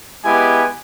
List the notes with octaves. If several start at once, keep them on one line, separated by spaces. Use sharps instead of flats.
G#3 B3 E4 G4 G#5